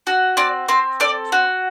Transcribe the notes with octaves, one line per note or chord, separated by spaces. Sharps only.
F#4
C4 D5
C4 C5
A4 D5
F#4